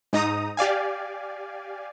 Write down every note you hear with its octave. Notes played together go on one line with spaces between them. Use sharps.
G#2 D#4 A#5 D#6
G4 D5 F5 G#5